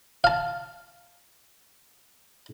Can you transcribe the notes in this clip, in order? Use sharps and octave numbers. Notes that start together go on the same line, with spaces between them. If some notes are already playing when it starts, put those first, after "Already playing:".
F5 A5